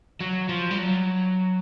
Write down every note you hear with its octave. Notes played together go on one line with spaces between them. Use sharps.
F#3
F3
G3
F#3